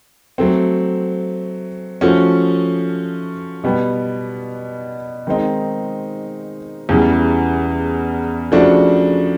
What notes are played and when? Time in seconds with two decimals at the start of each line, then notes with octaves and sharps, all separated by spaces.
0.38 F#3 A3 C4
2.01 F3 A3 C#4 F#4
3.64 B2 G3 B3
5.27 D#3 G#3 C4 D#4
6.89 E2 C#3 E3 G3
8.52 C#3 F3 A3 D4 F#4